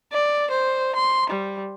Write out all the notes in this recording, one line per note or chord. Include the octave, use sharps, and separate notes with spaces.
D5
C5
C6
G3